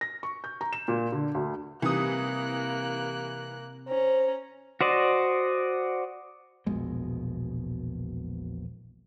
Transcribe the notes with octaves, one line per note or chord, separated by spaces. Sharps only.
A#6
C#6
G6
A#5
E7
A#2
D3
D2
C3 E3 G3 A#3 D#6 F#6
C#4 C5 A#5
F#4 C5 D5 D#5
E1 A#1 B2 G#3